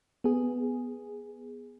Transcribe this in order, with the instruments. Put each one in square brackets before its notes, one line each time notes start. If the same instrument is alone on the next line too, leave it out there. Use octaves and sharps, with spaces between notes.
[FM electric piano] B3 G#4